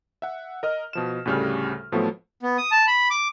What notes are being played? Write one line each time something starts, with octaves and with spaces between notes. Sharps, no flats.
E5 F#5
A#4 D#5 F6
B2 F3 E7
D2 A2 C#3 G3 F6
A2 F3 F#3 A3 B3
B3
D#6
A5
B5
D6